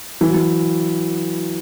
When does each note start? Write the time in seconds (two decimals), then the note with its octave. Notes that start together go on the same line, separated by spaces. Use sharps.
0.21 E3
0.28 F#3
0.34 E3